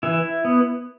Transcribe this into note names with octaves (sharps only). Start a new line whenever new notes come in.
E3 E4
B3